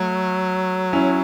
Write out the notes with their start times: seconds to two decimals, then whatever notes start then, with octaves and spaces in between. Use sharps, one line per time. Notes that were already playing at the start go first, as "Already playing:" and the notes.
Already playing: F#3 A3
0.93 C#4 E4